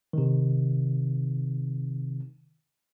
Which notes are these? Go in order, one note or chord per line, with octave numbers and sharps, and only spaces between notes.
C3 D#3